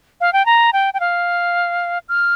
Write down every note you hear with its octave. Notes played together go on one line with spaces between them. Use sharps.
F5
G5
A#5
G5
G5
F5
F6